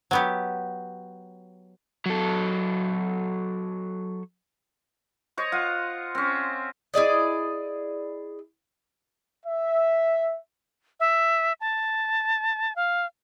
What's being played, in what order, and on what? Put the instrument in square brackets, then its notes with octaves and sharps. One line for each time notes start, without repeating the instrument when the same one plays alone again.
[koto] F#3 B3 G4
[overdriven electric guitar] F#3 A4
[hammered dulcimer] C5 C#5 D#5
F4 F#5
C4 C#4
[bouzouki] E4 G#4 D5 D#5
[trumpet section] E5
[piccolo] E5
A5
F5